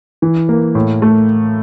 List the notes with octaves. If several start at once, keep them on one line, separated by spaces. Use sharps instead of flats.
E3
A#3
A2
A3